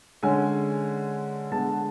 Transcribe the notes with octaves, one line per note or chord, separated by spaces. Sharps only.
D3 G#3 C#4 G#5
D3 G#3 B3 A5